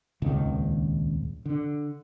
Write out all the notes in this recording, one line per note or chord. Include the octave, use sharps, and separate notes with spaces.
D#1 G#1 C#2 D#3
D3